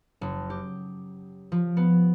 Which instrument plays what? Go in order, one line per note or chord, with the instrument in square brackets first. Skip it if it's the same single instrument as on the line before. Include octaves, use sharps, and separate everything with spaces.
[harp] F#1
G4
F3
B3